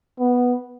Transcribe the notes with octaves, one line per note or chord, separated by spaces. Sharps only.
B3